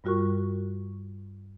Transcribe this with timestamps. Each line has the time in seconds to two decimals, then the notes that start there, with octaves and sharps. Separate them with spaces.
0.04 G2 G3 F4 F#4 A#4 C#6